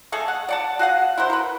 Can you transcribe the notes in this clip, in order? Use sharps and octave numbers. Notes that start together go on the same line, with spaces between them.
A3 G#4 A4 D#5
F#5
D5 F#5 A5
F#4 G#4 F5 F#5
E4 F#4 A#4 C5
A#4 B4